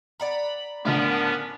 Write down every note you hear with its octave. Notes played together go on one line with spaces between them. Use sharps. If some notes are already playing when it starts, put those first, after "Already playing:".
D5 F#5 A#5 B5
A2 D3 F3 B3 C#4 D4 A#4